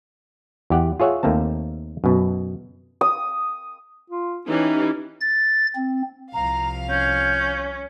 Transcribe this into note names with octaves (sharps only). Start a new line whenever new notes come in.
E2 G4 F#5
F4 G#4 C#5 E5 F#5
D#2 A3 A#3 C4 A5
F#2 B2
D#6
F4
E3 C#4 D#4 G4
A6
C4
C2 F3 F5 A#5
C#4 G6